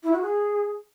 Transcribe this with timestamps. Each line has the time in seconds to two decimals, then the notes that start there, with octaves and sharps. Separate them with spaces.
0.03 E4
0.12 F#4
0.22 G#4